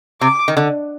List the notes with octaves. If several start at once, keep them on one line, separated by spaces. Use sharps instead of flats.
C3 D6
D#3
D3